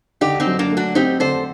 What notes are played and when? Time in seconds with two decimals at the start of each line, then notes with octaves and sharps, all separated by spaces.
0.21 D3 D#4 G4
0.40 C4 D#4
0.46 F#2
0.59 A#3 D4
0.71 A3
0.77 D4 F#4
0.95 C4 D#4 G4
1.20 D3 A4 C5